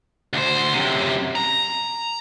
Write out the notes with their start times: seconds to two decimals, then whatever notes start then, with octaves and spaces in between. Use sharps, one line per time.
0.33 D2 C5
0.73 F#2 C3
1.35 A#5